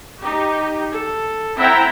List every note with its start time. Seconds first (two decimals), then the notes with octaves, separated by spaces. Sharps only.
0.20 D#4 G4
0.94 A4
1.57 C4 E4 E5 F#5 G5 A#5